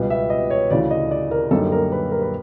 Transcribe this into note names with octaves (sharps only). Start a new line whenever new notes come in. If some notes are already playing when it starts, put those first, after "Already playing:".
Already playing: C#2 B2 G3 B3
E5
D#5
C#5
D2 C#3 E3 D5
D#5
D5
A#4
F#2 D3 G3 A#3 D#4 A4
A#4
B4
A#4
B4